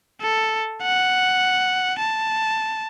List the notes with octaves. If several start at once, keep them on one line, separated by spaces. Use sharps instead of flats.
A4
F#5
A5